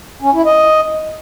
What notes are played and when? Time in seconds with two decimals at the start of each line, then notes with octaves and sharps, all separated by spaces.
0.22 C#4
0.34 E4
0.45 D#5